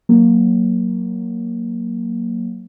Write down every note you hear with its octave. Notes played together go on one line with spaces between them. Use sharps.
F#3 A#3